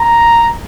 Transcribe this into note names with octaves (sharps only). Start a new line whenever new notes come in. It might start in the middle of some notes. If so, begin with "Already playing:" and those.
Already playing: A#5